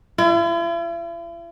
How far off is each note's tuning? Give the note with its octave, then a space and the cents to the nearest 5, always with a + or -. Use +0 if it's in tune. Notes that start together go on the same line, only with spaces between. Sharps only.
E4 +45